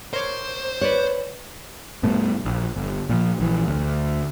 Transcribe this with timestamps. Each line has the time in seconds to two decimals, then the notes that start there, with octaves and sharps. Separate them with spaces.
0.13 A#4 C5 C#5 D6
0.81 B4 C#5 D5 F#6
2.03 G2 B2 A3
2.45 A#1
2.76 G1
3.09 A#2 E3 F3
3.40 A#1 E3
3.67 D2